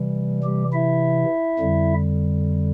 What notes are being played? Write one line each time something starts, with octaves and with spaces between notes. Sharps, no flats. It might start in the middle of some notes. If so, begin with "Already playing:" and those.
Already playing: C3 E3 G3
G3 G4
E4 E5
F2 D3 G3